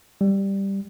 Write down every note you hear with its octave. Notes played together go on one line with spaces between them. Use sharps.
G3